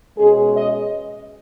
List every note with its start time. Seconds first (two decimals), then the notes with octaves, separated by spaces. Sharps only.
0.18 B2 G#3 C#4 G#4
0.56 D#5